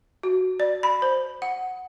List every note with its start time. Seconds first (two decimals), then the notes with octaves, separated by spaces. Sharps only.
0.23 F#4
0.60 D5
0.83 B5
1.02 C5
1.42 F#5